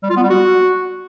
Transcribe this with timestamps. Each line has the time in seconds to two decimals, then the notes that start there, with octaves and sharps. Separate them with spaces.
0.03 G3
0.10 F4
0.17 B3
0.23 G3
0.30 F#4